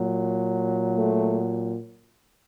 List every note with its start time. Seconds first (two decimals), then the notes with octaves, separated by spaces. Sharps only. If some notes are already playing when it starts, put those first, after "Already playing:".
Already playing: A#2 F#3
0.95 A3